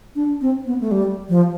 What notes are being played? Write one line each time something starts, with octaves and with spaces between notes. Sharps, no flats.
D4
C4
B3
A3
G3
F3